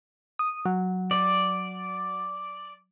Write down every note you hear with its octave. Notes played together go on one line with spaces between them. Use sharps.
D#6
F#3
D5